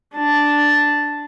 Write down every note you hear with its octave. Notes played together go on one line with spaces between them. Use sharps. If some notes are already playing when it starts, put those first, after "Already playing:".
D4 A5